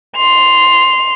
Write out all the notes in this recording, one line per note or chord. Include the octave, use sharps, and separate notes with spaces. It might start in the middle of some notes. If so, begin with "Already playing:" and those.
C6 F7